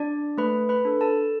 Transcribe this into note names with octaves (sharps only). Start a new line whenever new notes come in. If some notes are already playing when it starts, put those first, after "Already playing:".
Already playing: D4 D5
A3 B4 B5
B4 B5
D4 A4
A4 A5